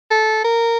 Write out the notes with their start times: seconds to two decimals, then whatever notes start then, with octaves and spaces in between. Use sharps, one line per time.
0.11 A4
0.45 A#4